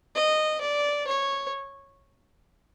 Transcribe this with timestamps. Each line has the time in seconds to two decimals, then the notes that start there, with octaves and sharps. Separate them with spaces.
0.15 D#5
0.61 D5
1.07 C#5